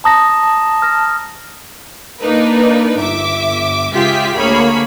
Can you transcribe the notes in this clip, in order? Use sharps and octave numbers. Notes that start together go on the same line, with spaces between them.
A5 A#5 D#6 A#6
F6 A#6
A#3 D4 D#4 A#4 B4
G1 E5 D6
C#2 F4 G4 G#4 E5 B6
D2 A#3 G#4 C#5 B5